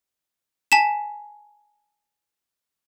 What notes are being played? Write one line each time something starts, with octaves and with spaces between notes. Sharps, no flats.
G#5 A5 B6 E7